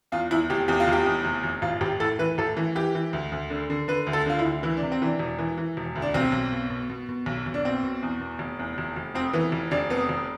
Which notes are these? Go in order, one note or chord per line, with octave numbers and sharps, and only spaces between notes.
E2 F4
E2 E4
F1 G4
E2 G4
F4
F1 G4
E2
F1
F1
A1 F4
A1 G4
A2 A4
E3 B4
A1 A4
E3
E3 G4
E3
D2
D2
D3
D3
D3 B4
D2
A4
D3 F4
E4
D2
E3 E4
D4
C3
C4
E3 D4
E1
E3
E3
E1
D2
D4
B1 C4
B1
B2
B2
B2
B2
B1
B1
D4
B2 C4
B2
E2
B2
F1
E2
F1
F1
F2 C4
E3 B3
F1
F1 D4
F2 B3
F1